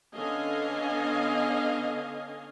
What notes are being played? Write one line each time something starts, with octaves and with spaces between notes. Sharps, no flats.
D3 B3 C#4 D#5 F5 G#5